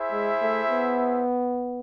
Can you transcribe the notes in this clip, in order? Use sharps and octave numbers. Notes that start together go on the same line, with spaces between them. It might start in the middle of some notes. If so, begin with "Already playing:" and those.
Already playing: E4 G#4 C5 E5
G#3
A3
B3